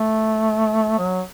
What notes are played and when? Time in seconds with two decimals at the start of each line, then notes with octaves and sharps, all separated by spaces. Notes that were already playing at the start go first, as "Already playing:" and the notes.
Already playing: A3
0.98 F#3